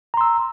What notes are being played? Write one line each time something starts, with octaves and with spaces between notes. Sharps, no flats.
A#5 C6 E6